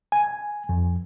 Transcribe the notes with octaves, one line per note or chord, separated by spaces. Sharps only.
G#5
F2